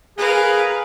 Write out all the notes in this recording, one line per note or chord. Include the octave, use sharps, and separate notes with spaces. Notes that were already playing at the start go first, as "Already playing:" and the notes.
G#4 A#4 B4 F5